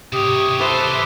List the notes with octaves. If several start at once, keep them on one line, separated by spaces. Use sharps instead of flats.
C3 G4 C#5 D#6
A4 B4 C5 E5 D6